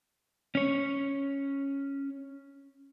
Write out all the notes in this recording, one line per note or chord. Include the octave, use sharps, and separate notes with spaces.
C#4 C#5